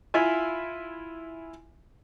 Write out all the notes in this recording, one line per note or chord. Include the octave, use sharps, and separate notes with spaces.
E4 F4 E5 G#5